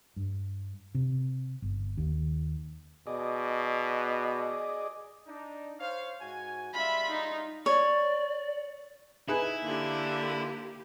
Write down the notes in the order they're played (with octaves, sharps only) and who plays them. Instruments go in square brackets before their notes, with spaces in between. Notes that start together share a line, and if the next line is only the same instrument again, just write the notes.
[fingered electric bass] G2
C3
G1
D#2
[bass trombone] B2 [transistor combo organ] G#4 D5 D#5
[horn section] D4 D#4
C5 C#5 F5
G#2 F#4 G#5
[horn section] G3 G#3 F4 [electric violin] E5 B5
[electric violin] D#4
[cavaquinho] C#5 [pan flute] D5
[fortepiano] D#4 G#4 B4 [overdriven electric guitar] E4
[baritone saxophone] D3 [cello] A#3 G4